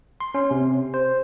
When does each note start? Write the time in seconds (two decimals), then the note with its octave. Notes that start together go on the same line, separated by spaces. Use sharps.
0.20 C6
0.34 C#4
0.51 C3
0.94 C5